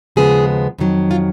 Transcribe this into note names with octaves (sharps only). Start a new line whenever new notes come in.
D#2 C#3 F3 G#3 B3 G#4
F2 D#3 F#3
F4